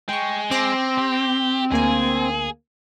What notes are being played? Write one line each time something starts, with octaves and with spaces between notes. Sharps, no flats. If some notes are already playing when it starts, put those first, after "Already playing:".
G#3 G5 C#6
C4 D6 A#6 C7
G4
D2 A#3 G#4 G#5